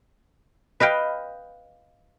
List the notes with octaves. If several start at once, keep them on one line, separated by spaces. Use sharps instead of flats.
B4 D#5 F5 G5